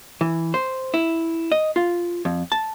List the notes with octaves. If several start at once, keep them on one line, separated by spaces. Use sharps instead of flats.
E3
C5
E4
D#5
F4
F2
A5